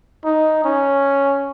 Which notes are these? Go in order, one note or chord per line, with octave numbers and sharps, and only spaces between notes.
D#4
C#4